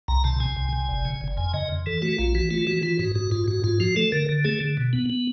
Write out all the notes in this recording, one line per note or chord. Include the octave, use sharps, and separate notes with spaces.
C2 A#5
C3 A5
C3 G#5
C2
C3
G1
C#3
G1
F2 G#5
C#3 D#5
F2
E3 A4
A3 F#4
A#1 F4
E3 F#4
A3 F4
E3 F#4
E3 F4
G#2 F#4
G#2 F#4
G#2 F4
G#2 F#4
G#2 F4
F3 F#4
A3 A4
D3 A#4
D3
A3 G#4
D3
B2
B3
B3